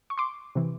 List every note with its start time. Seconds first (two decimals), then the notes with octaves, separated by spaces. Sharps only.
0.10 C#6
0.18 C6 D6
0.55 C3 E3